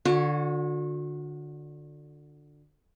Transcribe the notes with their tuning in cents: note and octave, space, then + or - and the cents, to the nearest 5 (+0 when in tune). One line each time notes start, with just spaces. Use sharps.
D3 +10 F#4 -40 C#5 +0